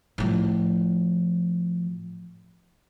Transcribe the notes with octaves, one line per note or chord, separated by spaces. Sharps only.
A2 F3